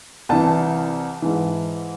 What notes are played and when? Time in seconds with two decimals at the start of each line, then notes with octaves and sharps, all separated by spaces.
0.29 C2 C3 E3 A5
1.22 G#2 E3